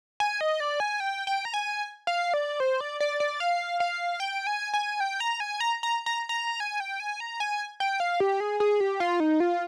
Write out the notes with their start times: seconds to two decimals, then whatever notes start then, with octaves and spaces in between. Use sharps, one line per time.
0.20 G#5
0.41 D#5
0.60 D5
0.80 G#5
1.00 G5
1.27 G5
1.45 A#5
1.54 G#5
2.07 F5
2.34 D5
2.60 C5
2.81 D5
3.00 D5
3.20 D5
3.40 F5
3.80 F5
4.20 G5
4.47 G#5
4.74 G#5
5.00 G5
5.20 A#5
5.40 G#5
5.60 A#5
5.83 A#5
6.06 A#5
6.29 A#5
6.60 G#5
6.80 G5
7.00 G#5
7.20 A#5
7.40 G#5
7.80 G5
8.00 F5
8.20 G4
8.40 G#4
8.60 G#4
8.80 G4
9.00 F4
9.20 D#4
9.40 F4